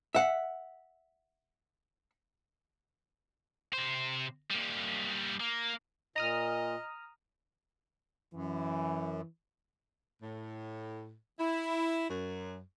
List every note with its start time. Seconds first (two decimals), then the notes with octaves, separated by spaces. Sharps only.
0.15 E5 F#5
3.73 C3 C5
4.50 G3 A#3
5.40 A#3
6.16 A#2 D#5 A#5 D#6 F6
8.34 F#2 E3
10.23 A2
11.39 E4
12.09 F#2